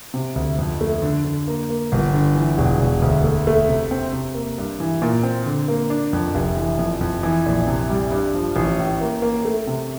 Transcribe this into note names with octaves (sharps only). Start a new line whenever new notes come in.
C3
D2
F2
A3
D3
D3
A#3
A#3
G1
D3
E3
E1
E1
D2
A3
A3
C3
C4
C3
A#3
G2
E3
A#2
C4
D3
A#3
D4
F2
F1
E3
F2
F2
E3
A#1
C3
G3
G2
F3
A1
A2
A#3
A#3
A3
C3